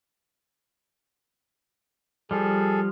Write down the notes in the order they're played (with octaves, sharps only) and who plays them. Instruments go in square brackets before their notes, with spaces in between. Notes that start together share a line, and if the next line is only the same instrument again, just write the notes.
[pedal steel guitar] F3 G3 [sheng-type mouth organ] G#4 A4